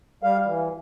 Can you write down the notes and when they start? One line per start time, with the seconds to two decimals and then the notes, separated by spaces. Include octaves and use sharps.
0.23 G3 F5
0.46 E3